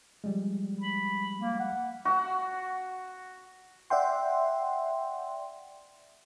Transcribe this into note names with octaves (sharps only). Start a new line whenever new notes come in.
F3 G3 G#3
B5
A#3
F#5
F#4 F#5
D5 E5 F#5 G5 C6